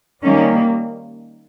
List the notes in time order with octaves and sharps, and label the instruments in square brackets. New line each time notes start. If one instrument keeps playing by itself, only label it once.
[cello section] D#3 G3 A#3 C#4